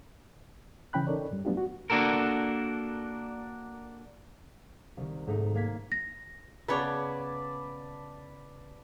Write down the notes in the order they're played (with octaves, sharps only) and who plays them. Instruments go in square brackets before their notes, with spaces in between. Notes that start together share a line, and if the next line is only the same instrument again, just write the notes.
[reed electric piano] C#3 E3 C#4 G5 B5 F#6
C#4 D#4 A4 A#4 C#5 D5
F#2 G3
F#3 A3 B3 D4 F4 G4
F#4
[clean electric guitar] A#3 D4 F#4 A4 A#4
[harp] C2 D#3
G#2 A3 D#4
A#3 G#6 B6
[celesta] A#6
[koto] C#3 B3 C#5 [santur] B4 D5 A5